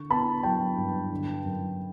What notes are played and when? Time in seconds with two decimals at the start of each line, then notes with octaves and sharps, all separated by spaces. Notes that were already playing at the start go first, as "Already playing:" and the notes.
Already playing: D3 C#6
0.10 B3 A5 B5
0.43 F#3 G5 A5
0.77 G2
1.11 D3
1.45 F#2